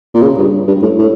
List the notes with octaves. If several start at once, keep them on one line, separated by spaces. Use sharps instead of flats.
A#2
C#3
G2
G2
A2
A2